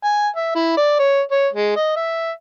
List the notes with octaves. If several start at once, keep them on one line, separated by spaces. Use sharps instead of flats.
G#5
E5
E4
D5
C#5
C#5
G#3
D#5
E5